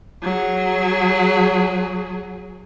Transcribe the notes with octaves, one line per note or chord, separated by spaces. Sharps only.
F#3 G#4